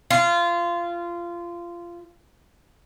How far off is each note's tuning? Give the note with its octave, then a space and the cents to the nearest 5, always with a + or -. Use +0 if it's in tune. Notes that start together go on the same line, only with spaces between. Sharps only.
F4 -20